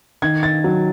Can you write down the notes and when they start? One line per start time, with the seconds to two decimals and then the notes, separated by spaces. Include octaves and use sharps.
0.22 D#3 G#6
0.43 A6
0.64 F#3